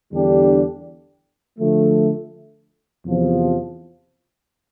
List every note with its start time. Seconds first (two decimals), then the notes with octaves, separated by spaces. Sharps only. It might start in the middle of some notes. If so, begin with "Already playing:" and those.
0.12 E2 D3 G3 D4 G4
1.59 D3 F3 A3
3.06 E2 C3 F3